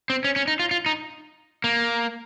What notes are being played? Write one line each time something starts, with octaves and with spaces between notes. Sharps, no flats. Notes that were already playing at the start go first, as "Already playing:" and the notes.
C4
C#4
C#4
D#4
F4
F4
D#4
A#3